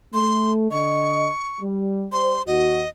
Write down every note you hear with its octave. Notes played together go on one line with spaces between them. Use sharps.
A3 C6
D3 D#5 C#6
G3
G3 C5 C6
D#2 F#4 D#5